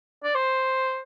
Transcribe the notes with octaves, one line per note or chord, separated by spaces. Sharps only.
D5
C5